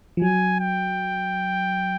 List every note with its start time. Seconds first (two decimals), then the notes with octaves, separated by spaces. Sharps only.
0.17 F3
0.22 F#3 G#5
0.60 G5